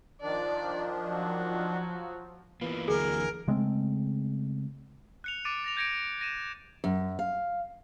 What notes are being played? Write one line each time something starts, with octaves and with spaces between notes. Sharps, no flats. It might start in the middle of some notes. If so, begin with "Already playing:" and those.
D#3 F3 D4 D5
F#3
E3 A#3 B3 F4 B4
D2 F#3 G#4 A#4 G#5
C#3 G#3 A3 C4
F#6 C#7 F7
D6 A6 D7 D#7
A6 A#6 F7
G6 G#6 A#6 C#7 D7 F7
A#6 D#7 E7
F#2
F5